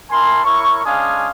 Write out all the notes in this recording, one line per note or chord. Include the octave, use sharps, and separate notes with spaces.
E4 A#4 G#5 A5 C6
E4 A#4 C#5 C#6
G#3 C#4 D4 F5 G#5 D#6